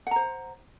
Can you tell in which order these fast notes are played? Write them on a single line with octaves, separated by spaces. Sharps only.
F#5 A#5 C5